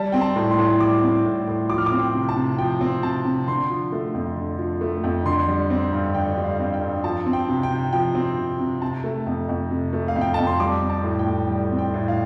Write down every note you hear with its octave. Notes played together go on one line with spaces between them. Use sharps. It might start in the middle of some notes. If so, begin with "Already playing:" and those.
Already playing: G3 A5
C4 G5
A5
A2
C6
A2
G3 D6
C4
A2
A2
F3 D6
F6
D6
C4
G5
C3
A5
C3
F3 G5
C4
C3 A5
C3
D3 C6
F3
A3
F2
D3
F3
A3
F2
D3 C6
G3
C4
G2
D3 G5
G3
F5
C4
G5
G2
F3 A5
C4
G5
C3
G5
C3
F3 G5
C4
C3
C3
C3 A5
A3
F2
F2
C3
A3
F5
F2
G5
F2 A5
C6
G3 D6
C4
A5
A2
G5
A2
G3
C4
G5
A2
F5